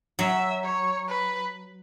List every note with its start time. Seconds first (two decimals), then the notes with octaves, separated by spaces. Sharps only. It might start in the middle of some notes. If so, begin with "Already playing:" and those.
0.19 F#3 E5
0.64 C#5
1.08 B4